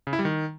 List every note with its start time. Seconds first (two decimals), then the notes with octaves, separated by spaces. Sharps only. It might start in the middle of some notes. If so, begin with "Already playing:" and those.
0.07 C#3
0.13 E4
0.19 G3
0.25 D#3